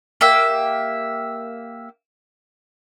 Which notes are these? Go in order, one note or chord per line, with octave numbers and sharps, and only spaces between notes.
A#3 G4 E5